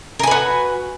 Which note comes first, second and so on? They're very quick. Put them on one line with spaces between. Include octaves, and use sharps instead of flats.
A#4 G#5 B4 F#4